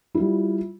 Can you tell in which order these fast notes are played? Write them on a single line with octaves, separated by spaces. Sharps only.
E4 F4 G3